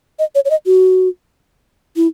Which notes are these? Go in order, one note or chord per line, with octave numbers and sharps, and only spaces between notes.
D#5
C#5
C#5
D#5
F#4
E4